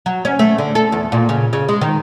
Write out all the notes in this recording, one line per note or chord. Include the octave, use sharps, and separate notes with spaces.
F#3
C#4
A3
D3
A4
E2
A#2
C#3
C#3
G#3
D#3